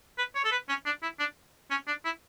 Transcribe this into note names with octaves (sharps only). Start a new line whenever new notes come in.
B4
C#5
A4
B4
C#4
D4
E4
D4
C#4
D4
E4